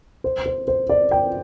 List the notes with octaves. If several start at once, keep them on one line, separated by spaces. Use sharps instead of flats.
C5
C5
C5
D5
G5